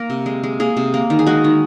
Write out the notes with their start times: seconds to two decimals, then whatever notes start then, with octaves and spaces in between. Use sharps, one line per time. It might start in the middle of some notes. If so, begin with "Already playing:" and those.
Already playing: A#3 A#4
0.10 C3
0.26 G#3
0.43 G#3
0.60 A#3 G#4
0.77 C3
0.94 A#3
1.10 D#3
1.19 G#4
1.26 G#3 F#4
1.44 D#3